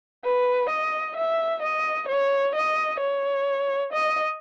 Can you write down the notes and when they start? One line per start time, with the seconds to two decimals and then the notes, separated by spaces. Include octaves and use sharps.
0.24 B4
0.69 D#5
1.16 E5
1.62 D#5
2.08 C#5
2.55 D#5
3.00 C#5
3.93 D#5